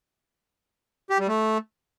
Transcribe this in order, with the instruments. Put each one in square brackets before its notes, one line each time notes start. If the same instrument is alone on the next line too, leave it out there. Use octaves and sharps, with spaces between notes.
[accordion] G4
G3
A3